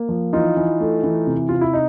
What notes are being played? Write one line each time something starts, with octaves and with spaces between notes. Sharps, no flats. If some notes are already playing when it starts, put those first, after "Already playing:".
Already playing: A#3
F3
E3 D#4 F4
E3
A3
E3
C3
C3 F4
E4
D#4